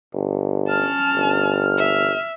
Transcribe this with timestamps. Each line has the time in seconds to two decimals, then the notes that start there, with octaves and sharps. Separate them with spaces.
0.14 G1
0.68 C#4 A5 F6
1.15 G1
1.78 E5